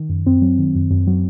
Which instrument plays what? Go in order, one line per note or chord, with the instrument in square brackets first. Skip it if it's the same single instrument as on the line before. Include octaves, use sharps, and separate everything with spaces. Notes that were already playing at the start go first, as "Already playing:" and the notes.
Already playing: [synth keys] D#3
F#2
F#2 C4
F#3
D#3
F#2
F#2
F#3